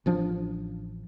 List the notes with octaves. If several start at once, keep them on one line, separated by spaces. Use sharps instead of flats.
A1 F3 D4